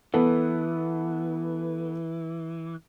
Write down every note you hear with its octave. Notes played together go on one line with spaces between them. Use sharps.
E3 B3 A4